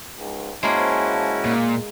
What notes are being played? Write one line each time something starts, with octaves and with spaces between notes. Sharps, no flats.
C#2 G#2
G#3 A#3 C#4 E4 F#4 C5 F5 A5
A#2